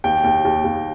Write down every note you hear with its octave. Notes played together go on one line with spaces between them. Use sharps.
D#2 G5
D#2
D#2
D#2